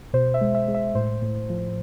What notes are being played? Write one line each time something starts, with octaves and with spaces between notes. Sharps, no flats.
B2 C5
E5
G#3
E5
G#3
E5
A2 C5
A2
F3